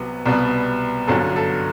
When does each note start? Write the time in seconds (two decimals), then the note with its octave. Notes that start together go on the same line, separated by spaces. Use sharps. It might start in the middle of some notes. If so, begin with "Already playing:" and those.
Already playing: C2 C3 F#3 B3
0.26 C2 B2 G3 B3
1.08 G1 F#2 D3 F#3 A4
1.36 A4